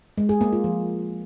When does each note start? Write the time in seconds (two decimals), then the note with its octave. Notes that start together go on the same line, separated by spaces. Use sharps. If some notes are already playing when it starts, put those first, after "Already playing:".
0.18 G#3
0.29 G#4
0.41 A#3
0.52 F4
0.64 F3